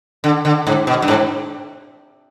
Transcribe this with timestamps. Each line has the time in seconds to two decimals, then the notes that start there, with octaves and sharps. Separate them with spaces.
0.24 D3
0.45 D3
0.67 G#2
0.87 B2
1.02 G2
1.08 G#2